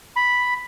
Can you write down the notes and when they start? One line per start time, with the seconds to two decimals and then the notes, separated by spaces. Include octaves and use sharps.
0.16 B5